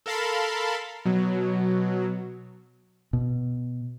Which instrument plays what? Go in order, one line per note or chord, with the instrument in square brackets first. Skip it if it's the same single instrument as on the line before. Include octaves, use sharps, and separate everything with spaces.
[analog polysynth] A4 A#4 F5 A5 B5 C6
B2 F#3
[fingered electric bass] B2